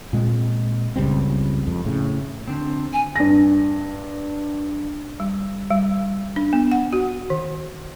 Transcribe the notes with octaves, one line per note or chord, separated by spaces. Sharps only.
A#2 G#3 C4
F#1 C#2 G3 C4
F2
A2 C#3
D3 C4
G#5
G2 A#6
G3
G3
D4
B3
F#5
F#4
D#3